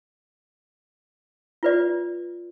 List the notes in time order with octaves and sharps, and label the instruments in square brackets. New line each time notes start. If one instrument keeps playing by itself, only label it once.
[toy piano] F4 B4 D5